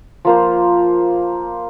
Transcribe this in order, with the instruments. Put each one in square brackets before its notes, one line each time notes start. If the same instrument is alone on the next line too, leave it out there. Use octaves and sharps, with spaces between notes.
[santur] F3 A#3 C5